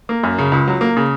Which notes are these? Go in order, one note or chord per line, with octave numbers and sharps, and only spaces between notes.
A#3
F#2
C#3
C#2
F#3
A#3
C#3